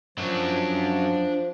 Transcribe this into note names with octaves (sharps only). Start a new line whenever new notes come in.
F#2 F3 F#3 D4